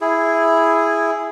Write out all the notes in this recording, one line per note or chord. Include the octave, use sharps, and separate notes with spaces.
E4 G#4